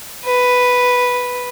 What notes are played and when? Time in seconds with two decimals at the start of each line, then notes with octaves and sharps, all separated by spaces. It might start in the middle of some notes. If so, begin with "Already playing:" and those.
0.25 B4